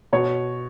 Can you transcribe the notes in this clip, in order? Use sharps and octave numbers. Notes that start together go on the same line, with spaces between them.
B2 C#5